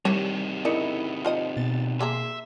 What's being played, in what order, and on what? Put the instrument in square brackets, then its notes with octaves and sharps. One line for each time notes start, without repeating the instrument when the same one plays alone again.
[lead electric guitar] C3 D#3 [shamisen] E3 A#4 C#5 [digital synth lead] G3
[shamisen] C#3 D#4 D5 [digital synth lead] E4 [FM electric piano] A#4 D#6 C#7
[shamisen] F4 C5 D#5
[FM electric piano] B2 [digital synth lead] A6
[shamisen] A#3 G#4 A#5 [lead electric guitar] E5 [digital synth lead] C6